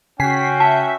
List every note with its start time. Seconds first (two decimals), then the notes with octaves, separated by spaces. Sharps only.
0.20 C#3 C#4 F#4 G5 G#5 B6 C7
0.60 E5 A5